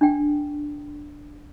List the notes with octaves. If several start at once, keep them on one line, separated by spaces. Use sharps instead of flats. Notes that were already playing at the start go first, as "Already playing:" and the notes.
D4 G5